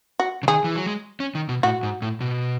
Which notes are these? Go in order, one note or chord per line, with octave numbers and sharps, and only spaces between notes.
F#4
C#3
D#3 G#4
E3
F#3
G#3
C#4
D#3
B2
A2 F#4
G#2
A2
B2